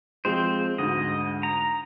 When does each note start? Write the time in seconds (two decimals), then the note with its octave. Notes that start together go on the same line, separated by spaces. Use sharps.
0.25 F3 G#3 C4 C5
0.78 D2 G#2 D#5
1.43 A#5